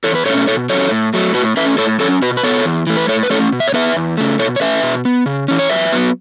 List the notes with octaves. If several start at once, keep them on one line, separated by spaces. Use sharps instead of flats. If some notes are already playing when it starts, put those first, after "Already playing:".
E2 A4 C#5
B4
B2 A3 C#4 A4 C#5
B2 A4 C#5
F#3 C#4 A4 C#5
A2
F#3 A3
A2 F#4 B4
A3 C#4 B4 E5
A2 A4 C#5
F#3 C#4 A4 C#5
B2 F#4 B4
B4
B3 A4 C#5
E2
E3 A3
B4
A2 A4 C#5
B4
A3 C#4 A4 C#5
B2
E5
C#5
B3 B4 E5
E2
C#3 A3
B2 A4 C#5
C#5
A3 C#4 B4 E5
B2
B3
C#3
E3 C#4
C#5
F#2 B4 E5
F#3 B3